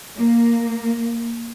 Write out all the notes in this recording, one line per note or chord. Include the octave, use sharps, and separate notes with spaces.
A#3